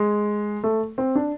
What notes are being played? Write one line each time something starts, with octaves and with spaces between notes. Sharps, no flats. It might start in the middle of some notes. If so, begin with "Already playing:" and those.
Already playing: G#3
A3
C4
D4